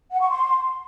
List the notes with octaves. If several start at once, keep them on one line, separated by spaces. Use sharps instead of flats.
F#5
C#6
C6